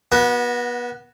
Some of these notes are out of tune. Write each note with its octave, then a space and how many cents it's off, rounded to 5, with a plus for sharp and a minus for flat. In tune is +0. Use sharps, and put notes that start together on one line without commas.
B3 -30 F#4 +0